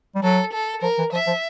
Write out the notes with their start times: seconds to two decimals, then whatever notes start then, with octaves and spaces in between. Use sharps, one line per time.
0.15 G3
0.22 F#3 A4
0.53 A4
0.82 F3 A#4
0.98 E3
1.13 F3 E5
1.27 F3